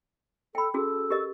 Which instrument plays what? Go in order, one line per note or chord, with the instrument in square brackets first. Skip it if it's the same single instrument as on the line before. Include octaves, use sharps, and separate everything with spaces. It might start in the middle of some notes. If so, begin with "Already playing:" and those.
[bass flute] A4 [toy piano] G5 B5
[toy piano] C#4 F#4 G#4 [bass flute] A4
[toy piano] G4 A#4 D#5